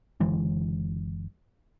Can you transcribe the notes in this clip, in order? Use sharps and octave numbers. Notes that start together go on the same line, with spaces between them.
F#1 D3 E3 G#3